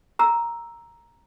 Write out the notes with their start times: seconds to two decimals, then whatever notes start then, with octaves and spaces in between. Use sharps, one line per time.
0.19 A#5 E6